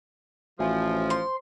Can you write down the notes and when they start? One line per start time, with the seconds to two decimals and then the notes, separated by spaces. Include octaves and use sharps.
0.59 A1 F3 F#4 E5 G#5
1.10 C5 C6